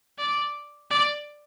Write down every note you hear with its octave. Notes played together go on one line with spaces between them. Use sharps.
D5
D5